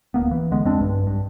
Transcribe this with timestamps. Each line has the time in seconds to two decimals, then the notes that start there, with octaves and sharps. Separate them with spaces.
0.14 D1 A#3 B3
0.31 E3
0.51 C2 D3 G#3 B3
0.65 F2 G#3 C4 D4
0.80 B1 G2
1.07 G2